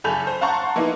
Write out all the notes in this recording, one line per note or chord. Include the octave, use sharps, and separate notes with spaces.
F#1 A4 G#5 B5 G6 F7
C5
F5 F#5 A5 A#5 C6 C#6
A#3 B3 D#4 E4